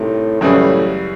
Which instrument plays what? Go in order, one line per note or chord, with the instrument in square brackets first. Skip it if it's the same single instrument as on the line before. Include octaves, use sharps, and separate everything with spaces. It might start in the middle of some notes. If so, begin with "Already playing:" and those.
Already playing: [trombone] A2 [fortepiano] C3 D#3 G3
[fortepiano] F#2 C#3 E3 G3 [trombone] A2